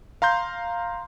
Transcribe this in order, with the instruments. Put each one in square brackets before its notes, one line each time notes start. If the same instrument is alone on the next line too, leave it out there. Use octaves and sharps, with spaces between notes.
[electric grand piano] F5 A#5 C6 G6